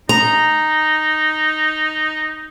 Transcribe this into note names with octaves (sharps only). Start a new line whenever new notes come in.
D#4 A#5